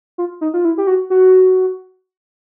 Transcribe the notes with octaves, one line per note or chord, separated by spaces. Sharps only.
F4
D#4
F4
E4
G4
F#4
F#4